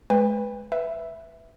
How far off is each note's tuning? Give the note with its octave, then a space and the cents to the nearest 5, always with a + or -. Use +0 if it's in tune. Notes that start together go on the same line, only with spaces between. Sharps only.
G#3 +30 B4 +0 G5 +40
B4 +0 E5 +0